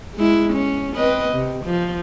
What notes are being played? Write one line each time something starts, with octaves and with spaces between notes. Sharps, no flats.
G#3 E4
C#4
C4 B4 D#5
C3
F3